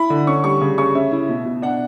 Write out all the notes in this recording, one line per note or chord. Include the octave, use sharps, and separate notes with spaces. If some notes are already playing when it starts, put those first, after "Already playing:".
Already playing: E4 B5
D3
C#4 C#6
G3 C#6
C#3
C#3 C#6
C#4 E5
E4
B2
B2
D4 F#5